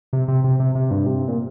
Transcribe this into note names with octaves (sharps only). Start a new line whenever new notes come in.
C3
C3
C3
C3
C3
G2
C3
A#2